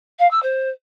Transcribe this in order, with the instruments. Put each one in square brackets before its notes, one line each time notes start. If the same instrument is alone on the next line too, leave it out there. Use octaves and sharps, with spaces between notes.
[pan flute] F5
E6
C5